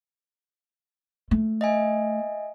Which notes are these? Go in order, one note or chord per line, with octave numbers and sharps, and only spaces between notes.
A3
D#5 E5 G#5